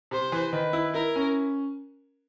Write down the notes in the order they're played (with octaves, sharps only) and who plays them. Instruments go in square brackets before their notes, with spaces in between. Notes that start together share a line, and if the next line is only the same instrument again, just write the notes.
[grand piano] C3 [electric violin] C5
[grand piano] E3
[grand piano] D#3 [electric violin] B4
[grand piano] E4
[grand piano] E4 [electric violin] A#4
[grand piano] C#4